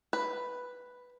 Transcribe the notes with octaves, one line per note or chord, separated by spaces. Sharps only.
B4